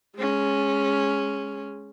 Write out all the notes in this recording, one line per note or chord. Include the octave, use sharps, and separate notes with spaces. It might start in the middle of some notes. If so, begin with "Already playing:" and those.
G#3 C#4